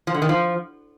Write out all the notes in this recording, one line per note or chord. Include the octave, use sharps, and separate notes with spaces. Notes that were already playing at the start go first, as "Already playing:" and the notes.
F3
D3
D#3
F3